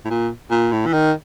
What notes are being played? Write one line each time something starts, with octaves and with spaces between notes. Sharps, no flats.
A2
A#2
A#2
A2
E3
D#3